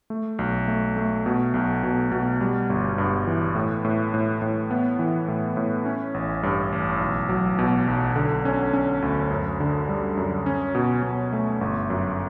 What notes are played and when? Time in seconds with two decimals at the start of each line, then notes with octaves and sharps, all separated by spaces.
0.10 A3
0.39 B1
0.68 A3
0.97 A3
1.26 B2
1.54 B1
1.83 B2
2.11 B2
2.41 G3
2.70 G1
2.98 G2
3.27 E3
3.55 A2
3.85 A2
4.14 A2
4.42 A2
4.71 B3
4.99 E3
5.28 A2
5.57 A2
5.86 C#4
6.14 A1
6.43 G2
6.72 A1
7.01 B1
7.29 F#3
7.59 B2
7.87 B1
8.16 D3
8.45 C#4
8.73 C#4
9.02 D2
9.31 F#2
9.60 D3
9.89 G3
10.17 F#2
10.46 C#4
10.75 B2
11.03 B2
11.33 A3
11.61 G1
11.90 F#2